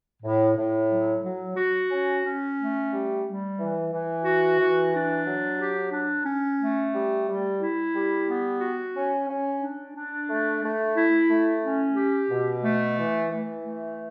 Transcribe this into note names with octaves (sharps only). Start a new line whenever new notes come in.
A2
A2
F#3
F#3
F#4
C#4
C#4
A3
G3
G3
E3
E3
F#4
E3
D4
F#3
G4
D4
C#4
A3
G3
G3
E4
G3
B3
F#4
C#4
C#4
D4
D4
A3
A3
E4
A3
C#4
G4
B2
A3
E3
E3
A3